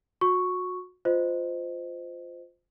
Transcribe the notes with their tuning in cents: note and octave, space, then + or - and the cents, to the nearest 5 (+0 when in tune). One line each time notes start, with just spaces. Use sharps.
F#4 -30 C#6 +0
F4 +10 C5 -20 D#5 +0